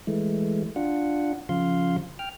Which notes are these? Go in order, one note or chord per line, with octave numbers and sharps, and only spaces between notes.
E3 G#3 A3
D4 F4 F#5
C#3 F3 F5 C6
G5 F6